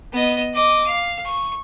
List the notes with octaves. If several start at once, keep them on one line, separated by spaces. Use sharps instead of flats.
B3 D#5
D#5 D6
F5
C#6